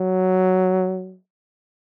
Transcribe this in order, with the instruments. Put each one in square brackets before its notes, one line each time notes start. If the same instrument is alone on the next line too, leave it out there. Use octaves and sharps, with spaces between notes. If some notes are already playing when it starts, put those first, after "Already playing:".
Already playing: [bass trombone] F#3